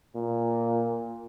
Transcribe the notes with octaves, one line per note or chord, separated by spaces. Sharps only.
A#2